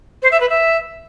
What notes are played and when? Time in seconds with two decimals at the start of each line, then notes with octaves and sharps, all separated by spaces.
0.22 C5
0.31 E5
0.40 B4
0.49 E5